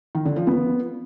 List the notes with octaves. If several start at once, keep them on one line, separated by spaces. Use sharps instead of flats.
D#3
D3
F3
B3